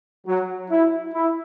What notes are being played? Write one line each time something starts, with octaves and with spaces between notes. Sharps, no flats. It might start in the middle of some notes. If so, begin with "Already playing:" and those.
F#3
E4
E4